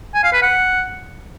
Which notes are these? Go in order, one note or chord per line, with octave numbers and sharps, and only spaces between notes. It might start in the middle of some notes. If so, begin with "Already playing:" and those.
G#5
F5
B4
F#5